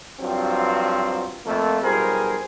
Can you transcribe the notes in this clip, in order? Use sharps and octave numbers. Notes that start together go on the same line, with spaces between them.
G2 F3 F#3 C4
F2 A3 A#3
B1 F3 G3 G#4 A#4 C5